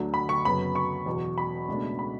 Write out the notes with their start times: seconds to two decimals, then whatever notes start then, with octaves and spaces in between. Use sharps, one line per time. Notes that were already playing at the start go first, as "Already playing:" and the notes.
Already playing: D2 D3 F#3
0.14 B5
0.29 C#6
0.45 F#1 F#2 C#3 F#3 B3 B5
0.75 C#6
1.06 E2 B2 F#3
1.38 B5
1.68 C#2 B2 A3 D4
1.99 B5